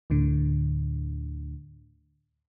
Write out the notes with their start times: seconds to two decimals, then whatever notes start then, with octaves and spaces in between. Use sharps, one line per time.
0.10 D2 A2 D3